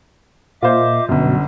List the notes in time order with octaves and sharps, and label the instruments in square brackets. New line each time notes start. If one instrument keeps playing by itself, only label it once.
[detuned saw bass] A#2 [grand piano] F4 C5 [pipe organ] D#5 E5 D6
[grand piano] G1 F#2 [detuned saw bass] B2 [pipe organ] F#3